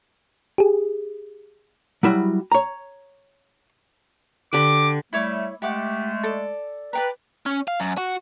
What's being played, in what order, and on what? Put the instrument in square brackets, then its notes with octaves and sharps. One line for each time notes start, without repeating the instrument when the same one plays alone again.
[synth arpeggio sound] G4 G#4
[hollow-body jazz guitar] F#3 G3 E4 F#4
C#5 A#5
[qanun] D3 G4 B4 [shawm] D6
[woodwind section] G3 A3 [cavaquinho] E4 C#5 D6
[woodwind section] G#3 A3 [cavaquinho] G4 F#5 D6
[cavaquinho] A4 D5
[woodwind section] B4 [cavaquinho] D5 G5 A#5
[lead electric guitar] C#4
F5
F#2
F#4